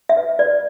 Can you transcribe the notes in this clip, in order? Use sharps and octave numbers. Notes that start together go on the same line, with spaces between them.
E5
B4
B4 D5